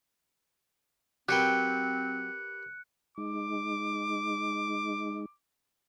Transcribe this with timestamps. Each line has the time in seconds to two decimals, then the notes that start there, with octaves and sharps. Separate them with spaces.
1.29 F#3 C4 G4 A#4 B4 G5 F#6 C#7
3.18 G#3 D#4 D6